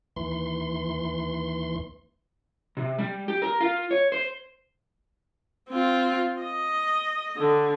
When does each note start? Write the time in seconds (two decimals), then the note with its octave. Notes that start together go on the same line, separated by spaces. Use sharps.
0.16 D#2 E3 C6
2.77 C3
2.98 G3
3.28 G4
3.42 A#4
3.61 F4
3.91 C#5
4.12 C5
5.70 C4 F4
6.42 D#5
7.37 D3